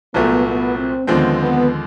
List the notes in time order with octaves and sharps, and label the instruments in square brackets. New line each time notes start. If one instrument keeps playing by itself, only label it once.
[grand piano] C2 A#2 F#3 A3 [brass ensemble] B3
[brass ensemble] B3
C4
[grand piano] D#2 D3 F3 G#3 C4 [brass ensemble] B3
[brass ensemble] B3